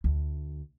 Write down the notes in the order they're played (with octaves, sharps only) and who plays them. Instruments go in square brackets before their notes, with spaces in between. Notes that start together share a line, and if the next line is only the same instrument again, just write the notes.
[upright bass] D2